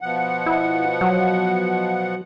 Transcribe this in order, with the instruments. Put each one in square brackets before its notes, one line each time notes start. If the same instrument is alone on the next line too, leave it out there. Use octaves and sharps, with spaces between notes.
[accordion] B2 F3 F#5
[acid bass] E4
F#3